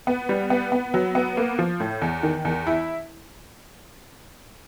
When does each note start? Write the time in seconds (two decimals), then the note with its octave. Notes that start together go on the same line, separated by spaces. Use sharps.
0.07 B3
0.29 G3
0.50 B3
0.72 B3
0.94 F#3
1.15 B3
1.37 A#3
1.59 F3
1.80 A2
2.02 E2
2.23 D#3
2.45 E2
2.67 E4